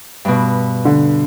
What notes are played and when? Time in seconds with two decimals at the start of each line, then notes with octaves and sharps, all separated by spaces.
0.25 G2 B2
0.85 D3